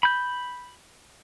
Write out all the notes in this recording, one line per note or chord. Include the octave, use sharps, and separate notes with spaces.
B5 G6